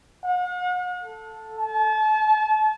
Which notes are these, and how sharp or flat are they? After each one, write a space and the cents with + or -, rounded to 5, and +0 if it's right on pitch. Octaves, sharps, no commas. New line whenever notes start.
F#5 -45
A4 +0
A5 -35